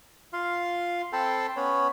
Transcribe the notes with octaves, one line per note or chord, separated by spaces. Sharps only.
F4 F5 C6
C4 A4 G5 A5 B5 C6
B3 C#4 C#5 B5